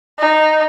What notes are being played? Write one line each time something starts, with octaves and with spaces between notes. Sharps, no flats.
D#4